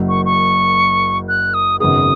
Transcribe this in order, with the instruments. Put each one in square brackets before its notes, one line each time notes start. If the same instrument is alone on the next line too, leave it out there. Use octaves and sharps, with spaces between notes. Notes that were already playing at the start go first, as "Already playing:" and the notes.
Already playing: [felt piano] F#1 F#2 F#3
[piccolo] C#6
C#6
F#6
D#6
[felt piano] G#1 F#2 C#3 B3 G#4 [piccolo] D#6